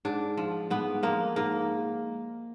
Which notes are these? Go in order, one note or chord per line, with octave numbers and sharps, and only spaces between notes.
G#2 D4
F3
G#2 B3
F3 A#3
G#2 A#3